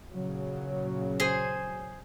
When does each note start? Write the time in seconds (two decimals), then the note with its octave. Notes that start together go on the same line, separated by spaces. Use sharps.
0.12 A#2 C#3 F#3
1.20 G#4 C5 G#5